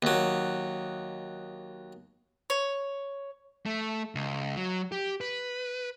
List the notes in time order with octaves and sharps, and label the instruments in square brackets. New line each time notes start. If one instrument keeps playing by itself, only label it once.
[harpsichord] D#2 F#3
[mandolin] C#5
[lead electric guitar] A3
C#2
F#3
G4
B4